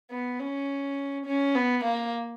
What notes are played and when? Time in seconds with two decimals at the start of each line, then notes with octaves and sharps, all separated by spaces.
0.11 B3
0.40 C#4
1.26 C#4
1.55 B3
1.84 A#3